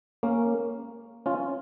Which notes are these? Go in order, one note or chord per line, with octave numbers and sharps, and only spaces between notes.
A#3 C#4
C#4 F4